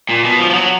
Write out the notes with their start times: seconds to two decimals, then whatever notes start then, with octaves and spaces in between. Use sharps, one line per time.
0.09 A#2
0.24 B2
0.39 F3
0.51 F3
0.54 F#3